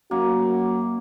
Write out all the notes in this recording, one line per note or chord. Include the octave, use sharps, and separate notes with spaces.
F#2 A#3 F#4